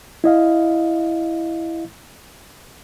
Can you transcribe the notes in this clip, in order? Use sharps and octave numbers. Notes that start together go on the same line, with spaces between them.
E4 D#5 F5